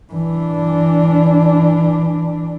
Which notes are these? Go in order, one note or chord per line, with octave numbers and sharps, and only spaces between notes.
E3 D4